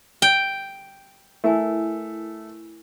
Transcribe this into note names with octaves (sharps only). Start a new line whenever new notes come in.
G5
A3 E4 A#4 G#5